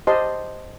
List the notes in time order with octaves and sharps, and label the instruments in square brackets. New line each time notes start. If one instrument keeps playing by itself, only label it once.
[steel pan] G4 C5 D#5 A5 C6